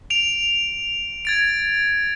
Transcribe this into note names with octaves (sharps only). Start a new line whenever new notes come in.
D7 F7
G#6 A6 D7